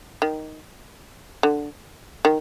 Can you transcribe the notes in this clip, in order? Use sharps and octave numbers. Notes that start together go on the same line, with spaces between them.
D#3
D3
D#3